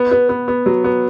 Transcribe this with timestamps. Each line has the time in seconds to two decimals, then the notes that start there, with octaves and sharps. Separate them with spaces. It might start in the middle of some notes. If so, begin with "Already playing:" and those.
Already playing: B3
0.11 B3
0.29 B3
0.48 B3
0.66 F#3
0.84 B3